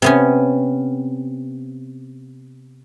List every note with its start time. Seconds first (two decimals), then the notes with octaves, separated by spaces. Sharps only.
0.02 C3 B3 C#4